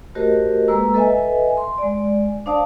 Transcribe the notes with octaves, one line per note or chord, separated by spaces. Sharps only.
A3 F#4 G4 A#4 C5 D#5
G#3 A#3 A4 B4 A#5 E6
A4 B4 D#5 E5 G#5
C6
G#3 D5
D4 C5 D5 F5 A5 D#6